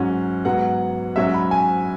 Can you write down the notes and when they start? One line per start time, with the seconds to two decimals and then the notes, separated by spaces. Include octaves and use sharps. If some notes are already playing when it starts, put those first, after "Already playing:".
Already playing: G#2 F#3 C#4
0.45 G#2 F#3 B3 F#5
1.16 G#2 F#3 C#4 E5
1.34 B5
1.51 G#5